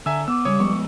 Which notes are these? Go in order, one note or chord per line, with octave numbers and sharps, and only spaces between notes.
D3 E5 G#5 A#5 E6
B3 D6 E6
C#3 G3 C#5 D#6
F3 G#3 B3 C#6